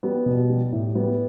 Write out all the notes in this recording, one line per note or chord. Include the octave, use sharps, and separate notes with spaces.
G3 B3
B2
G3
A2
G3 B3